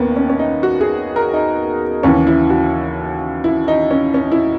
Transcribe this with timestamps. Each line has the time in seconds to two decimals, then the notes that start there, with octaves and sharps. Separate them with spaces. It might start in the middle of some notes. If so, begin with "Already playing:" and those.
Already playing: D#2 D#3 A#3 B3 C#4
0.17 C#4
0.30 C#4
0.39 D#4
0.63 F#4
0.81 G#4
1.16 A#4
1.34 D#4
2.03 D#2 C#3 E3 C#4
2.27 E4
2.50 F#4
3.44 E4
3.68 D#4
3.91 C#4
4.14 C#4
4.32 E4